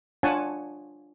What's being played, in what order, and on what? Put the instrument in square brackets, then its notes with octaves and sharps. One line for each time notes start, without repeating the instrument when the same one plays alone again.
[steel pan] D4 F4 C#5 F#5 G#5 A5